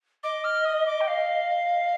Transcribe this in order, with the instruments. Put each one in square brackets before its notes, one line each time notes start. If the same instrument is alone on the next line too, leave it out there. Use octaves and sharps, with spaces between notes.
[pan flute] D#5 [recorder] D6
[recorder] F6
D#6
D6
G5
F5